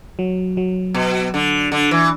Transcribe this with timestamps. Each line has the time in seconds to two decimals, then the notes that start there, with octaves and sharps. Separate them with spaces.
0.19 F#3
0.57 F#3
0.94 B2
1.34 D3
1.72 D3
1.91 E3